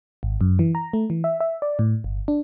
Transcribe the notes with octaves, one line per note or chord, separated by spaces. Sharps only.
G#1
F#2
E3
A#5
A3
E3
E5
E5
D5
A2
G1
D4